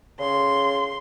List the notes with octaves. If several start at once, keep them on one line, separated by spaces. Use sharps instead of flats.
C#3 C6